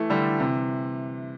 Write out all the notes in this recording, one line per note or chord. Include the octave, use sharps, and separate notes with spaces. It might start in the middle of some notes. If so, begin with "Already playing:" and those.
Already playing: E3 A3
D3 G3
C3 E3